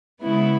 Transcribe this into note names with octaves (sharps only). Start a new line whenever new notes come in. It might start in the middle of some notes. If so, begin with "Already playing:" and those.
C#3 G#3 B3 E4